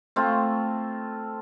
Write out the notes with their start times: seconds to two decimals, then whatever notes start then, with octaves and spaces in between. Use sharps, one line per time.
0.16 A3 C4 F4